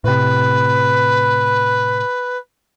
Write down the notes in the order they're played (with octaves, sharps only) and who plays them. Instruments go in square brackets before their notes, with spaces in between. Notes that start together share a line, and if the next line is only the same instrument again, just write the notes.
[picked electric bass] A2 C3 [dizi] B4